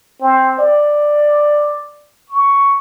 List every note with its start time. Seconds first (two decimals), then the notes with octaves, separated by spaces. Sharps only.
0.21 C4
0.59 D5
2.30 C#6